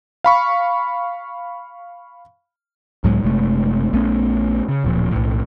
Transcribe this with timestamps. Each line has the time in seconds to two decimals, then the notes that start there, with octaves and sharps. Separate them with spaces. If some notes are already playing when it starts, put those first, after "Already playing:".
0.24 F5 B5 C#6
3.04 C#2 A2 F#3 G#3
3.23 F#1 C3 G#3 A3
3.93 A#1 A3 B3 C#4
4.69 C#3
4.84 D1 A#2 F3
5.11 B1 A2